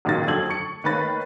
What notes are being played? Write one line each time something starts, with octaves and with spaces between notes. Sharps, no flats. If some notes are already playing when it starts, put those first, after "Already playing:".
C#2 A#2 D#3 F#3 A#3 A6
F2 D3 F#3 A4 G#6 F#7
C#6 C#7
D#3 A#3 B4 C#5 B5 A6